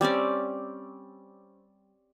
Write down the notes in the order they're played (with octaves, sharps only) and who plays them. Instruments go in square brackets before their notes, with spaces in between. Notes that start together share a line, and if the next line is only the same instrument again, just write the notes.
[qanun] G3 C4 C#4 D5